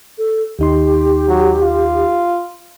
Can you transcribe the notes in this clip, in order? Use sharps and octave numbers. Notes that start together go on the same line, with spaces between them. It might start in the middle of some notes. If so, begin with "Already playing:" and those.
A4
D#2 D#4 G4 C6
F#3
F4